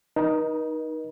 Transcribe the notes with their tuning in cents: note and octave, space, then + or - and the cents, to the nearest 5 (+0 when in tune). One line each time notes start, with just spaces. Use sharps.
D#4 +0 A#4 +45